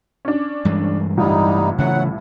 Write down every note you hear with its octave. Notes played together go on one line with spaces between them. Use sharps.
C#4 D4
G2 E3 G#3
G1 C2 A2 G3 D#4
C#3 E3 F#3 A3 F#5